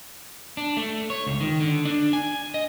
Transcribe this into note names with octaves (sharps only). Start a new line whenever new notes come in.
D4
A3
C#5
C#2
D#3
D3
D4
G#5
D#5